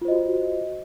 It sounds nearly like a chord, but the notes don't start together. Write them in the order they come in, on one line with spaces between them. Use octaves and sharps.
F4 C5 D#5 F#4